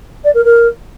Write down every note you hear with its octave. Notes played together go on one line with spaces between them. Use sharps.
D5
A#4
A#4